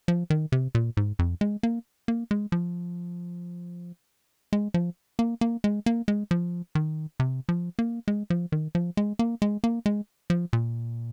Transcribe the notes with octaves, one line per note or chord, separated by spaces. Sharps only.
F3
D#3
C3
A#2
G#2
F2
G#3
A#3
A#3
G#3
F3
G#3
F3
A#3
A#3
G#3
A#3
G#3
F3
D#3
C3
F3
A#3
G#3
F3
D#3
F3
G#3
A#3
G#3
A#3
G#3
F3
A#2